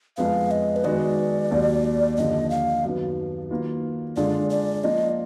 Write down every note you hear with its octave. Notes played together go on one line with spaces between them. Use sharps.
F2 F3 G#3 B3 F5
D#5
B4
D#3 G#3 B3 D#4 F#4 D5
D#2 D#3 F#3
D#2 D3 F3 D#5
F5
F#2 D#3 F#3 B3
D#3 F#3 A#3 F4 B4
D3 G#3 D4 F4 G#4 D5
D5
F3 A#3 F4 D#5